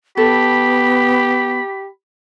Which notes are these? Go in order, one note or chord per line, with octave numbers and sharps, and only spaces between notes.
B3 G4 A4 B5